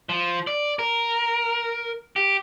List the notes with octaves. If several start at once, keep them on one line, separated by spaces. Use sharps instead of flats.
F3
D5
A#4
G4